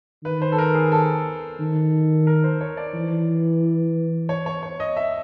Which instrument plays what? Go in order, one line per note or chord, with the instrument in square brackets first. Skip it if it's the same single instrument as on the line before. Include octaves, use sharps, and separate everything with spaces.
[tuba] D#3 [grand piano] B4
[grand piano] C5
A4
A#4
G#4
A4
[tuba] D#3
[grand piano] A#4
C5
C#5
D5
[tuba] E3
[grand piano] C#5
C#5
C#5
D#5
E5